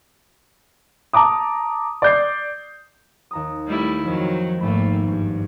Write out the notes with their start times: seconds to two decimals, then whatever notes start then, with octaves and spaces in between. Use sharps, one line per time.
1.13 A5 A#5 D6 D#6
2.02 D5 G6 C7
3.31 D#2 A#5 D#6
3.67 G3 A3 E4
4.05 F2 D#3 F3 F#3
4.60 G#1 G#2 A3 A#3 B5
5.07 G2